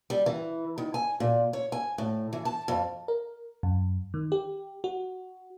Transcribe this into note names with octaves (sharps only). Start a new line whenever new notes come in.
G3
E3
D#3
G#5
A#2
C#5
G#5
A2
E3
A5
F2
A#4
F#2
D#3
G4
F#4